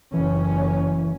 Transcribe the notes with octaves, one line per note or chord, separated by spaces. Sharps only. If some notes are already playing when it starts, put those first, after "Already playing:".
F#1 E3 C#4